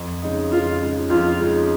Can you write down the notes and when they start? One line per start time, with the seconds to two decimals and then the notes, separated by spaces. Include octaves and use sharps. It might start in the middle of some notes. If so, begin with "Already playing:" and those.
Already playing: F2
0.22 C#3 G#3 D#4
0.52 F2 F4
0.81 C#3 G#3 D#4
1.10 F2 F4
1.39 C#3 G#3 D#4